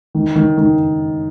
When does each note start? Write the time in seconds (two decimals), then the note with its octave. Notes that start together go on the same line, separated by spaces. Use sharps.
0.15 D#3
0.36 D#3
0.57 D#3